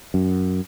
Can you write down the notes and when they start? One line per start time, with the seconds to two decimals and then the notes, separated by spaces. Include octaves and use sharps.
0.14 F#2